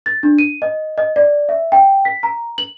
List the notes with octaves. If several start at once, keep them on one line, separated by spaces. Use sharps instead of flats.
A6
D4
D#7
D#5
D#5
D5
E5
G5
B6
A#5
F#7